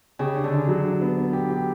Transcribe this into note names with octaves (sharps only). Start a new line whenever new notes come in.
C#3 G4
D4
D3
D4
F#3
D4
B3
B3
G4
G4